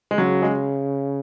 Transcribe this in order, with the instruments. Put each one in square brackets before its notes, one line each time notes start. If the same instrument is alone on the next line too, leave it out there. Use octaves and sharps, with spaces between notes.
[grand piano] G#3
[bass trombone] C#3 [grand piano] F#3
[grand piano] G#3